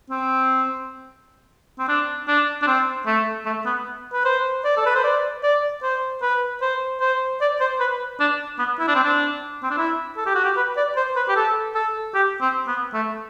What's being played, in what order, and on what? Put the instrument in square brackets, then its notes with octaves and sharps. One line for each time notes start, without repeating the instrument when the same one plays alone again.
[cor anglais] C4
C4
D4
D4
D4
C4
A3
A3
B3
B4
C5
D5
A4
B4
C5
D5
D5
C5
B4
C5
C5
D5
C5
B4
D4
B3
E4
D4
C4
D4
C4
D4
E4
A4
G4
F#4
G4
B4
D5
C5
B4
G4
A4
A4
G4
C4
B3
A3